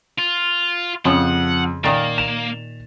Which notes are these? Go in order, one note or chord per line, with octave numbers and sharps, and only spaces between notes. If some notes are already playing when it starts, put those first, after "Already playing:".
F4
F2 C#3 F3 F#5
A#2 D#3 A#3 A6
E7 F7